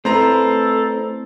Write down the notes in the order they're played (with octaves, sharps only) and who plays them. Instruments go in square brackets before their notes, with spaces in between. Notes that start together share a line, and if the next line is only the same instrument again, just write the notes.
[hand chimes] A3 C6 [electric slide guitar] C4 E4 B4 [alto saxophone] A4 [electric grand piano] C5 A#5